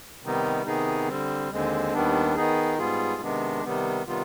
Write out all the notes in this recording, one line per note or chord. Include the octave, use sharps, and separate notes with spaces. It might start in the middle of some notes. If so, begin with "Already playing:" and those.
C3 D#3 G3 B3 D#4
C3 D#3 B3 D#4 G#4
D3 G3 C4
D#2 D3 G#3 C4
D#2 D#3 G3 B3 D4
D#3 B3 D#4 G#4
G#2 G3 B3 F4 G#4
C3 D#3 G#3 B3 D4
C3 D#3 G3 B3
C3 D#3 G3 B3 F4